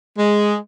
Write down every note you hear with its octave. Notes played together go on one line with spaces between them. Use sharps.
G#3